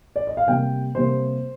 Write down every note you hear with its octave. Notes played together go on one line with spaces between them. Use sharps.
D5
D#5
F5
C3 G3 A#3 G5
C3 G3 A#3 C5